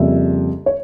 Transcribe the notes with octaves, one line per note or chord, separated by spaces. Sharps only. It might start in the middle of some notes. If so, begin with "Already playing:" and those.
Already playing: F2 C#3 G3 A#3 E5
C#5